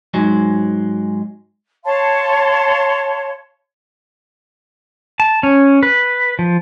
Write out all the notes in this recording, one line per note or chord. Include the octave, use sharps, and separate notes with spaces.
G#2 F#3 G#3
C#5 F5 A5 C6
A5
C#4
B4
F3